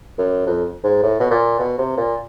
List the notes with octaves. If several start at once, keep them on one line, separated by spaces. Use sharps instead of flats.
F#2
F2
G#2
A2
B2
A#2
B2
C3
A#2